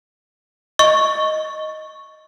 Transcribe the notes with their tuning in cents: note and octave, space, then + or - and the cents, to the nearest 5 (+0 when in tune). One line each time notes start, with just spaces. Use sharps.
D#5 +0 C#6 +0